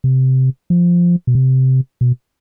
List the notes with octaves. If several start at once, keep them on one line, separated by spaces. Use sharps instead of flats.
C3
F3
B2
C3
B2